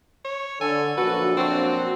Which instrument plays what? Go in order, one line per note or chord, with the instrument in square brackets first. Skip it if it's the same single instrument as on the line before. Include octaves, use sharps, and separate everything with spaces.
[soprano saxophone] C#5
[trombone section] D3 [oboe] A4 [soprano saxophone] G#5
[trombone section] A#1 F#2 D4 [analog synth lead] F#4 [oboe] A4 [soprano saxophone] B4
[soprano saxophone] C4 [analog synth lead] F#4